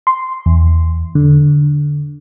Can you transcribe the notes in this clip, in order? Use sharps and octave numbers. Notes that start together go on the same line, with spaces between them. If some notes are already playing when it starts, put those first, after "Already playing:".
C6
E2
D3